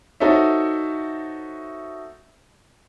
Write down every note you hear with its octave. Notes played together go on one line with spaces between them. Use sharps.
D#4 F#4 A4 C5 C#5 E5